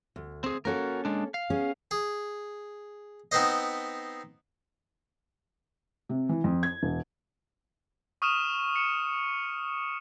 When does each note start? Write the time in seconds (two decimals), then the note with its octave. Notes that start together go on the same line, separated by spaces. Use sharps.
0.16 D2
0.44 C4 G#4
0.65 A#3 C#4 F#4 A4 A#4
1.05 G#3 D4
1.34 F5
1.50 B3 C#4 G#4
1.91 G#4
3.32 B3 C4 D#4 B4 C5 D#5
6.09 C3
6.29 E3
6.44 F2
6.63 G#6
6.83 E1
8.22 C#6 D#6 F6 D#7 E7
8.76 C#7 E7